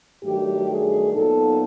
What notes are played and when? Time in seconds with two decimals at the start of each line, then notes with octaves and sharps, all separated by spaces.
0.23 G2 D#3 F#3 A3 G4
0.68 G#4
1.14 A#2 F#3 B3 D#4 A4